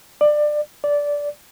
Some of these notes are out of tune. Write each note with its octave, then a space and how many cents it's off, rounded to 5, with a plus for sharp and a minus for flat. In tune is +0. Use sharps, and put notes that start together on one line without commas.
D5 +20
D5 -15